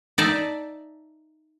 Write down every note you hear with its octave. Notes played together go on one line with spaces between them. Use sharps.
D#4 D5 E5 A5